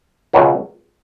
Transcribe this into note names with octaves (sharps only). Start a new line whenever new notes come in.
C#2 B2 F#3 A#3